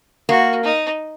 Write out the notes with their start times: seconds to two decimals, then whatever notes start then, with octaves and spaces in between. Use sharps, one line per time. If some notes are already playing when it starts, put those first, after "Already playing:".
0.29 A#3 F#4
0.63 D#4